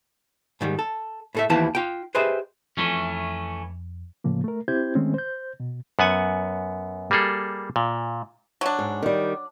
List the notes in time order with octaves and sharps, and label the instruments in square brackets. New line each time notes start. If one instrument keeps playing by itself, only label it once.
[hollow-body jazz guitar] G#2 D#3 G3
A4
A2 A4 E5
D#2 E3 F3 B3 E4 A5
F4 G5
G4 G#4 B4 C5 D#5 E5
[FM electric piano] F2 [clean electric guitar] E3 A3 C#4
[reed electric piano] A2 C#3 F3 A#3
A3 A#4
C4 E4 G4 C5 G6 G#6
D#3 G#3 A3 C4 C#4
C5 G6
B2
[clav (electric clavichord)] F#2 B3 F#5 G#5
G3 A#3 G#4 A4
A#2
[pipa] F#3 D4
[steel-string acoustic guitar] G#2
D#3 G3